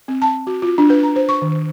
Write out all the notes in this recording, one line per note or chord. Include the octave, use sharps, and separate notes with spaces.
C4
A5
F#4
F4
D4
B4
A#5
C5
C#6
D#3